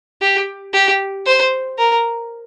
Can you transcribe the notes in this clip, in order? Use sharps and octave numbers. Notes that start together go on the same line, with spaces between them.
G4
G4
C5
A#4